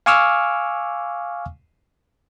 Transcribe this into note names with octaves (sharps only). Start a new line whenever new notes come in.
F5 G#5 C#6 D6 E6 F6